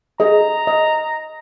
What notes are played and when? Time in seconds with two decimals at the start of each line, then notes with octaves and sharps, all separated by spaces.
0.20 G#4 D#5 A#5
0.67 D#5